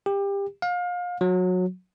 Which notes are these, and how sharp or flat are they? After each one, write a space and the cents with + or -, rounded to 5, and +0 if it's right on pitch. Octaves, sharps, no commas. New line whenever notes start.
G4 +25
F5 +30
F#3 -20